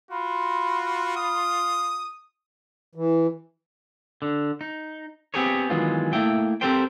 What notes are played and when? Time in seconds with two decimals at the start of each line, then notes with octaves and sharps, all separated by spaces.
0.11 F4 F#4 B5 C6
1.17 D#6
2.95 E3
4.22 D3
4.61 D#4
5.34 B3 C4 G4 G#4 A#4 C#5
5.70 D#3 E3 F#3 G#3 B3 F4
6.13 A3 A#3 E4 G5
6.61 C4 G4 A4 A#4 C5 G5